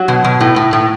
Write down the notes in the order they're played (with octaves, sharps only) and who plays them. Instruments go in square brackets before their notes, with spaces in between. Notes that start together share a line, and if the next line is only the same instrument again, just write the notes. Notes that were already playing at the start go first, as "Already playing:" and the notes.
Already playing: [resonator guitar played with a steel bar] F#3 F#4
B2
B2
A2
A2
A2